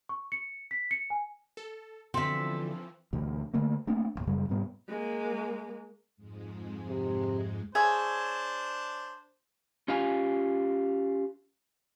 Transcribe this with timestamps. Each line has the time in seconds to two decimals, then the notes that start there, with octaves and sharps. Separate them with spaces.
0.09 C#6
0.32 C#7
0.71 B6
0.91 C#7
1.10 G#5
1.57 A4
2.14 B2 D3 E3 F3 C4 A4 E5
3.13 D2 B2 E3
3.54 D3 A3 A#3
3.87 A3 A#3 C4 D4
4.15 A1 D#2 A#2
4.27 F#2 C#3 G3 G#3
4.49 G#2 B2 G3 B3
4.89 G#3 A#3
6.17 F2 G#2 G#3
6.89 C3
7.75 D4 G#4 C5 C#5 E5 A5
9.88 C#4 F4 G4 F5 G#5